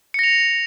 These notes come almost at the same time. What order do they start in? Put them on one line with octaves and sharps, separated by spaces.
C#7 A#6 F7